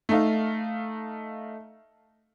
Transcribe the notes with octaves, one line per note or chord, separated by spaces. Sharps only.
A3 D#4 F5